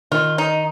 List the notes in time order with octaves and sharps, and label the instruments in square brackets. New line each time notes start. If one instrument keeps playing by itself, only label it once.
[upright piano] D#3 [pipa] F4
[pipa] D#4